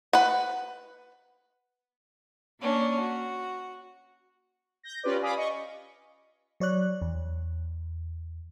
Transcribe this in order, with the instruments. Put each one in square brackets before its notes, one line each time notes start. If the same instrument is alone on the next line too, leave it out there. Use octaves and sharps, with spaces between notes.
[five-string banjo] B4 F#5
[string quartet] A#3 C#4 D4
F#4
[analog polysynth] G6 A#6
C#4 F4 G4 B4 D5
D5 F5 G#5 B5 D6 D#6
D#5 C#6
[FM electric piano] F#3 C#5 D5 F#6
E2